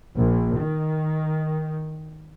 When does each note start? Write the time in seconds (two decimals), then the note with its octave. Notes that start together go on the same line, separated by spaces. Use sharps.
0.16 A#1
0.57 D#3